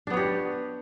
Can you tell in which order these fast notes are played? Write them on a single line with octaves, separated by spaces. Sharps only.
D4 B3 C#5 G4